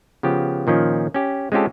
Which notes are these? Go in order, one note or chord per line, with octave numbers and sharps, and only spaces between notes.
C#3 F3 B3 G4
A#2 D#3 F3 C#4
C#4 G4
G#3 C4 C#4 F4 G4 A4